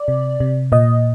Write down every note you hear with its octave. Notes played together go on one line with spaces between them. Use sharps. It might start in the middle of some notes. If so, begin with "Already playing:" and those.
Already playing: D5
C3
C3
A#2 D#5